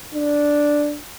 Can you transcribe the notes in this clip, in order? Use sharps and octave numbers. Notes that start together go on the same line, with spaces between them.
D4